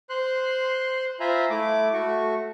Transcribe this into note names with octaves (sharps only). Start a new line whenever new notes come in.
C5 C6 F#6
F4 C5 E5 G#5 A#5 B5
A3 E4 D6
A3 F#4 C#6